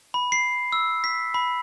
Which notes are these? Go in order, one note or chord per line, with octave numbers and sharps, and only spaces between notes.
B5
C7
E6
B6
B5